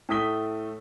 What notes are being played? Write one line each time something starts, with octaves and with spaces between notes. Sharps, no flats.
A2 A3 D#6 B6 G7